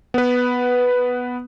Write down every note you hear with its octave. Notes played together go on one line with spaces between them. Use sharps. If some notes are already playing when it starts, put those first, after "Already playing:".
B3 B4